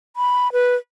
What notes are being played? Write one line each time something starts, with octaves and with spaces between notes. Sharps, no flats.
B5
B4